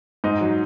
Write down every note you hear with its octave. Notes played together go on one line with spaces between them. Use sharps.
G#2 D#4
F#3